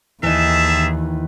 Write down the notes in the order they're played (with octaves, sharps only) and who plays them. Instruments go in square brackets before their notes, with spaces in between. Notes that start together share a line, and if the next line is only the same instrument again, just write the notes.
[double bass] D#2 [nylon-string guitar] D#3 E3 [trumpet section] G#4 E5 A5